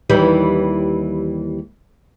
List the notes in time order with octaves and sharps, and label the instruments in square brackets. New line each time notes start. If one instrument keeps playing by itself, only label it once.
[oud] D#2 E3 G3